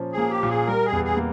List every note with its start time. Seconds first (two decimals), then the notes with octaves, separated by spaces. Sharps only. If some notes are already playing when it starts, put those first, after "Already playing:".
Already playing: A#2 F3 A#3 C#4
0.12 G#4
0.18 A#3
0.30 G4
0.43 A#2
0.49 G#4
0.67 G3 A#4
0.86 G#4
0.92 E2
1.05 G#4
1.17 A#3